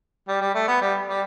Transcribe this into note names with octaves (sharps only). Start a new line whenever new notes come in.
G3
G3
A3
B3
G3
G3